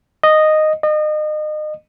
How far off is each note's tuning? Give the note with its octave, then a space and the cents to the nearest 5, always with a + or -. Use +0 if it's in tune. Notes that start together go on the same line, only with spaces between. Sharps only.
D#5 -10
D#5 -35